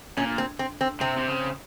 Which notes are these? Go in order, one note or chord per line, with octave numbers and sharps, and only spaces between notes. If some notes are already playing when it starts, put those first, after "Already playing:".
A#2 C#4
C4
C4
C4
C3 C4
C3
C#3